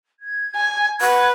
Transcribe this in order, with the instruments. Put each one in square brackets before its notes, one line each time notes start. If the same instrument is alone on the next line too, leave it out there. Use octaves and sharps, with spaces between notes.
[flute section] G#6
[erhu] G#5
[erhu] B4 [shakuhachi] F#5